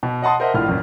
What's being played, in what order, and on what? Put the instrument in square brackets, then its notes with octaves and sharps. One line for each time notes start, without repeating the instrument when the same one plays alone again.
[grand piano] B2
D#5 F#5 A5 C6 D#6
A#4 C5 D#5 E5 F#5
A#1 A2 F4 F6
A1 F#2 A#2